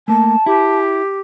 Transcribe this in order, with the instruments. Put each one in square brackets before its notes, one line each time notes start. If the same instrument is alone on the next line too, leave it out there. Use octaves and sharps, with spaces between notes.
[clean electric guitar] A3 A#3 [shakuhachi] A5
[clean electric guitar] E4 [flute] G4